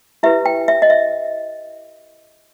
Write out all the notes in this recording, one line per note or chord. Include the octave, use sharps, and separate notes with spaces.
E4 G4 B4 E5
G5
E5
D#5
E5